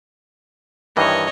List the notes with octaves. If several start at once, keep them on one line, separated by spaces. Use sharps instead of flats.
G2 D#3 E3 C#5 D#5